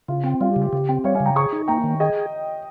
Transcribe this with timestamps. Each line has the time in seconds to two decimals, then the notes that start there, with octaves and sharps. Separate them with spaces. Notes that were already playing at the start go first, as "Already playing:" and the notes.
0.08 C#3 F4
0.24 C4
0.41 G3 F4
0.51 G4
0.56 C#3
0.62 G4
0.73 C#3 G4
0.89 C4
1.04 G3 C#5 F5
1.15 F5 G#5
1.20 C#3
1.26 G5 A#5
1.36 G#4 A#5 C#6
1.52 D#4
1.68 A#3 G5 A#5
1.84 D#3
2.00 G#4 D#5 G5